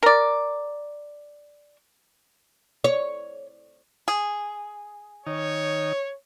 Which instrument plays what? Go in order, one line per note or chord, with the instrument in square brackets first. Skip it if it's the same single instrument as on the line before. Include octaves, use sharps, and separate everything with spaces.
[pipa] A#4 D5
[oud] C#5
[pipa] G#4
[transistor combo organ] D#3 D#4 [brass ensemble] C#5